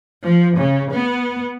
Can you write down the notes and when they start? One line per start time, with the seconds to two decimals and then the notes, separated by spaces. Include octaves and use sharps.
0.23 F3
0.58 C#3
0.92 B3